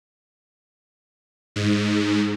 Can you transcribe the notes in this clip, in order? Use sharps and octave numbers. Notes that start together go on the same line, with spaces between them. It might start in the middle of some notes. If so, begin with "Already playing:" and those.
G#2